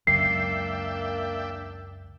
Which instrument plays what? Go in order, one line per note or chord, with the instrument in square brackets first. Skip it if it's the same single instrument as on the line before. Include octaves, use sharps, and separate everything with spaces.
[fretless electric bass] C#2 F#2 [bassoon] A#3 [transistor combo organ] D4 E5 G5 [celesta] C7